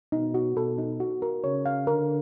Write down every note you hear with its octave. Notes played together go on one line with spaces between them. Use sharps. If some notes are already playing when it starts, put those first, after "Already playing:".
B2 D#4
F#4
B2 A4
D#4
F#4
A#4
C#3 C#5
F5
D3 A#4